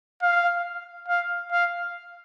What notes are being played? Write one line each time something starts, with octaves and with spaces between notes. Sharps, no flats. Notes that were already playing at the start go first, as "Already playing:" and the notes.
F5
F5
F5